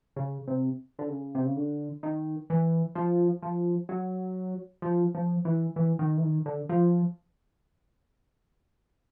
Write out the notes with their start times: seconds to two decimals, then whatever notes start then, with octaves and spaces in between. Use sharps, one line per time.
0.16 C#3
0.48 C3
0.99 D3
1.09 C#3
1.35 C3
1.46 C#3
1.56 D3
2.03 D#3
2.50 E3
2.95 F3
3.42 F3
3.89 F#3
4.82 F3
5.15 F3
5.45 E3
5.76 E3
5.99 D#3
6.17 E3
6.22 D#3
6.46 D3
6.69 F3